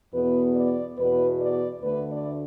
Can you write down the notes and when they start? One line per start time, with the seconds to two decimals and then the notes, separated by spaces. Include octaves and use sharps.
0.13 E2 B2 B3 B4
0.56 D5
0.98 E2 B2 B3 B4
1.40 D5
1.82 D2 D3 A3 B4
2.11 D5